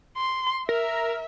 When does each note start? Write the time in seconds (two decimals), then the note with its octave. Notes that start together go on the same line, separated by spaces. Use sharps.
0.17 C6
0.69 A#4 E5